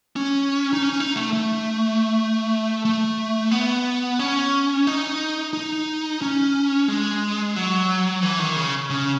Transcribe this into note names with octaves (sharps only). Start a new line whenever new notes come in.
C#4
D#4
C#4
D#4
A3
A3
A3
B3
C#4
D#4
D#4
C#4
G#3
F#3
E3
D#3
C#3
C#3